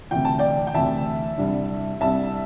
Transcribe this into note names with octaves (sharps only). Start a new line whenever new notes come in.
D2 C3 E3 G5
A5
D5 G5
G5
D2 C3 E3 E5 A5
C2 C3 G3 D4
C2 C3 G3 D4 E5 A5